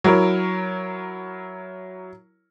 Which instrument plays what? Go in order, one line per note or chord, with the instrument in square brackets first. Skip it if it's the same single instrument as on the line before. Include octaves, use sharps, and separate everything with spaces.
[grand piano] F#3 E4 A#4 C#5